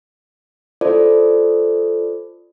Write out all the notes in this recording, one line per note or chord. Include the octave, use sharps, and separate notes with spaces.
F4 A4 C5 D5